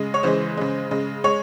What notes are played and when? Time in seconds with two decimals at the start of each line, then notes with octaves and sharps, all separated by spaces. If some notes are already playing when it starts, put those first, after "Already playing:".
Already playing: C#3 G#3
0.14 C#5
0.23 C#3 E3 G#3 C5
0.57 C#3 G#3
0.91 C#3 G#3
1.24 G#3 C#5